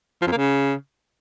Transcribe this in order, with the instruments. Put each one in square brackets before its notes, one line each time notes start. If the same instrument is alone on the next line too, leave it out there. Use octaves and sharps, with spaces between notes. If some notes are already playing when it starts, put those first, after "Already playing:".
[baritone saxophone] F3
F2
A#3
C#3